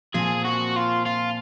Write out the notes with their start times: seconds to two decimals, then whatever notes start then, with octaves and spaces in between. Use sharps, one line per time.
0.14 A#2 F3 C4 G#4
0.44 F#4
0.76 F4
1.06 F4